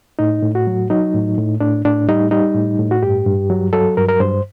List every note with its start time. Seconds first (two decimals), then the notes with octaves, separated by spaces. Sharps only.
0.19 A2 D#4
0.42 A2
0.55 F#4
0.67 F#3
0.90 F#3 D#4
1.14 A2
1.38 A2
1.60 A2 D4
1.85 A2 D4
2.09 G3 D#4
2.31 G3 D#4
2.55 A2
2.79 A2
2.91 F#4
3.03 G2 G4
3.27 G2
3.50 F#3
3.73 F#3 A4
3.97 G2 A#4
4.08 A#4
4.20 G2 C5